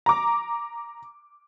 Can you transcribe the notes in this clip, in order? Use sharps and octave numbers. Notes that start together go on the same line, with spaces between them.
A#5 D6